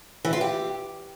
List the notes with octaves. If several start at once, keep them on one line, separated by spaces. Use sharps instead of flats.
E3
F4
G4